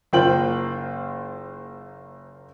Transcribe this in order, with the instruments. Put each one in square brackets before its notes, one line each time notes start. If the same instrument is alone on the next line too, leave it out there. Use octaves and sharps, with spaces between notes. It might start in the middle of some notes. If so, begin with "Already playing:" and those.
[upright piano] F#1 A#3 F4 C5 G5 F#7